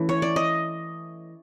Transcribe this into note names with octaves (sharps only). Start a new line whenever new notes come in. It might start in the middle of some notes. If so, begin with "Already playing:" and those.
Already playing: E3 A3 C#4
C#5
D5
D#5